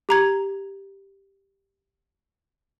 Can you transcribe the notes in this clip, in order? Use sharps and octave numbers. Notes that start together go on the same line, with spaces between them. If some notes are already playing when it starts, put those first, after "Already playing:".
G4 A#5 G#6